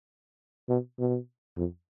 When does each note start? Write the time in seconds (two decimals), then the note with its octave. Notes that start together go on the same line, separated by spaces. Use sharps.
0.69 B2
0.99 B2
1.57 F2